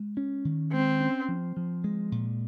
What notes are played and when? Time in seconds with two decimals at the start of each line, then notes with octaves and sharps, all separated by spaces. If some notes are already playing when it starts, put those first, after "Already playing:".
Already playing: G#3
0.17 C#4
0.45 D#3
0.72 G#3 C4
1.01 C#4
1.28 F3
1.57 F3
1.84 G#3
2.12 A#2